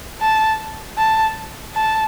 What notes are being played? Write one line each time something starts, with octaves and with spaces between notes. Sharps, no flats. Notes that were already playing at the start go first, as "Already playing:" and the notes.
A5
A5
A5